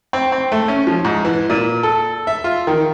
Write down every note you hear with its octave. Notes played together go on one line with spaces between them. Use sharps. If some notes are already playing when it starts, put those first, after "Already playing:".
C4
C4
A3
C#4
F3
G#2
E3
A#2
A4
E5
F4
D#3